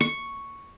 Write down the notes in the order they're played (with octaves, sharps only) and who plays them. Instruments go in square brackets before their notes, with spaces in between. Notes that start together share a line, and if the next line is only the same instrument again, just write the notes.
[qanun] C#6